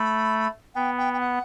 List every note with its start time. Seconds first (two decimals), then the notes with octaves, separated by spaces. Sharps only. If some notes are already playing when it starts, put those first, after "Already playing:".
Already playing: A3 B5
0.75 B3 G5
0.97 G5
1.13 G5
1.20 F#5